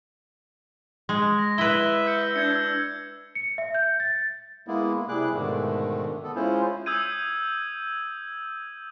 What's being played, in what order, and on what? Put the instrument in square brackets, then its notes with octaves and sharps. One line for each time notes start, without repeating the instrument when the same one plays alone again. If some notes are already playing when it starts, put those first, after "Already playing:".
[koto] G#3
[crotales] A#6
[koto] E4 B4 [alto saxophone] E5 [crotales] G7
[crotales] E6 G6 C#7
[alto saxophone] D4 [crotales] G6 G#6 C#7
[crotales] E6 G#6
[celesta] C#7
E5
G6
A6
[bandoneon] G#3 A#3 B3 E4
C3 G3 E4 G#4 D6 F#6
G#2 B2 D3 D#3 A3
B3 A4
G#3 C#4 E4 F4 C5
[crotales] D#6 E6 G6 G#6 D#7